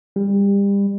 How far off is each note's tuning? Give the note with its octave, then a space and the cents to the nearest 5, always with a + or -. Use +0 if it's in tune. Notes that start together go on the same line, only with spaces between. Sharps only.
G3 +30